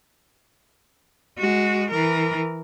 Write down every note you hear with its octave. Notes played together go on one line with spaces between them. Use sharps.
G#3 F#4
E3 A#4